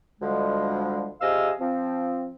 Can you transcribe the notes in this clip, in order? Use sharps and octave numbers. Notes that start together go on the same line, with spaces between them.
D2 D3 F3 G3 G#3
C3 F3 G#4 D#5 F5 E6
F3 C4